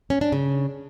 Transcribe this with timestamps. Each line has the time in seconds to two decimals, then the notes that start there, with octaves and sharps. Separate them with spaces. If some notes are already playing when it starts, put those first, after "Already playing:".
0.10 C#4
0.21 D4
0.32 C#3